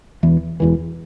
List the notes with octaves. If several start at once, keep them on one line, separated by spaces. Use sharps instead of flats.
E1 E2 E3
E1 E2 E3